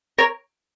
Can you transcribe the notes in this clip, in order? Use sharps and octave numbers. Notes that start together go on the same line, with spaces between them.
A#4 C#5